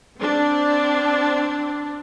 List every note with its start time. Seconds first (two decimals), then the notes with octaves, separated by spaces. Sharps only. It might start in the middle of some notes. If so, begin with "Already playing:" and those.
0.19 C4 D4